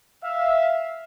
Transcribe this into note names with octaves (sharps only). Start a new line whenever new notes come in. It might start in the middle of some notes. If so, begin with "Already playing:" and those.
E5 F5